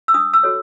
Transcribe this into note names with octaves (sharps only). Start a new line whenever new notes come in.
E6
D4 D#6
E6
F#4 A4 C#5